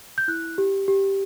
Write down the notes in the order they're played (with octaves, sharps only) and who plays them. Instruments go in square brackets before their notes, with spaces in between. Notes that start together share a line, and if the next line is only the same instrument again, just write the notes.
[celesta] G6
E4 F#6
G4
G4